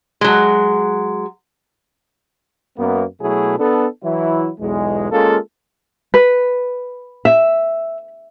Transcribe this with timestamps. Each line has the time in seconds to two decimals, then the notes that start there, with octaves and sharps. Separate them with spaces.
0.21 F#3 G#3
2.78 F#2 A#3 B3
3.21 B2 F#3 A3 E4 G#4
3.59 B3 D4 A4
4.04 E3 F#3 E4
4.60 B1 E2 G#3
5.12 G#3 A#3 C#4 F4 A4
6.14 B4
7.25 E5